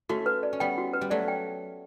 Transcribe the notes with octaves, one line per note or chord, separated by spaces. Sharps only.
A3 C#4 F#4
B4
D5
C#4
G3 B3 G5
F#4
B4
G3
F#3 A3 D5
G5